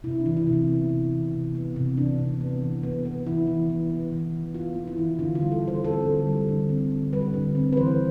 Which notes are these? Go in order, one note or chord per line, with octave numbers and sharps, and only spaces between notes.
C3 E4
D4
E3
E4
C3
E4
B3
C3
E3
C3
B3
C3
E3 D4
C3
B3
E3
B3
B3
E3 E4
E3
B3
B3
E3
E3
B3 F4
B3
E4
E3
D3 F4
F4
G3
A4
D3
C5
C4 A4
D3
G3
D3
C4
D3
G3 B4
D3
C4
B4
E3 C5